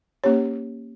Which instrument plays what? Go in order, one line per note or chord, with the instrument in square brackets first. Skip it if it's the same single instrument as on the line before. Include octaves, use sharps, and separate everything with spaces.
[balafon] A#3 C#4 G4 C#5